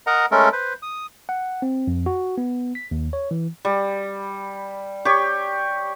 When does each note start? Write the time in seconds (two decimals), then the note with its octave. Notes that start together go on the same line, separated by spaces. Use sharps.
0.07 A#4 D#5 F#5 A#5
0.31 G#3 A3 C#4 A4 A#4
0.53 B4 C5
0.82 D#6
1.29 F#5
1.62 C4
1.87 F2
2.06 F#4
2.38 B3
2.75 B6
2.91 D#2
3.13 C#5
3.31 E3
3.65 G3
5.05 G4 C#5